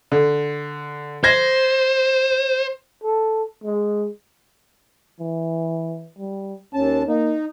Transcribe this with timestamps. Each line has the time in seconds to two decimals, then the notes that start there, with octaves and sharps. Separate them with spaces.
0.12 D3
1.24 C5 G#6 A#6
3.04 A4
3.64 G#3
5.20 E3
6.18 G3
6.74 D#2 C#4 A5
7.08 A#3 D#4